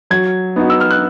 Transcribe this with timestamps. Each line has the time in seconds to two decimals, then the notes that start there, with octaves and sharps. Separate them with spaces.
0.10 F#3 G#6
0.56 B3 D#4 F#4
0.70 E6
0.80 F6
0.91 F#6